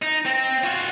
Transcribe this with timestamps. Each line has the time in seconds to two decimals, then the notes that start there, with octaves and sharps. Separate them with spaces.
0.02 D#4
0.26 C4
0.64 F4 F#4